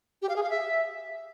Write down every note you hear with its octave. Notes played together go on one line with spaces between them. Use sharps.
G4
F5
G#4
F5
E5